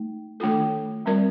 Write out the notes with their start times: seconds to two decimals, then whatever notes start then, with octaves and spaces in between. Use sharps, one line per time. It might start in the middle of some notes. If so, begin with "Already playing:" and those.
Already playing: A3 D#4
0.40 D#3 A3 D4 F4 A4
1.06 G3 C4 F4 A#4 D5